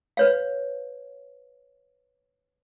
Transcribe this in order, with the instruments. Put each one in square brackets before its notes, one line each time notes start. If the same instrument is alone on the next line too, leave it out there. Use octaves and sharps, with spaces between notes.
[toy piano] B4 C#5 F5